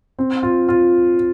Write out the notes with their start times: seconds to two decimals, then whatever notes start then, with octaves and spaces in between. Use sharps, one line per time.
0.19 C4
0.43 F4
0.69 F4